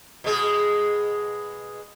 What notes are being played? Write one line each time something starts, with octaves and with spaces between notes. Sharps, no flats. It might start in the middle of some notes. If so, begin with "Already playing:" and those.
B2 G#3 G#4